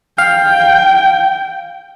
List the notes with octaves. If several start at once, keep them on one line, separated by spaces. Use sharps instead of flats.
F5 G5